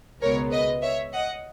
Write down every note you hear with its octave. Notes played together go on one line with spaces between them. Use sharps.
C#2 B2 G#3 B3 A#4 C#5
B4 D#5
C#5 E5
D#5 F#5